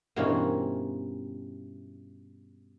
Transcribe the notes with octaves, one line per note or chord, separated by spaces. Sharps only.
G2 B2 E3 A#3 C4 C#4